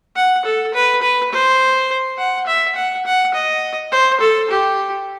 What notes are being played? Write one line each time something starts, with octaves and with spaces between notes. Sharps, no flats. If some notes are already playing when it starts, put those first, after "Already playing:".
F#5
A4
B4
B4
C5
F#5
E5
F#5
F#5
D#5
C5
A4
G4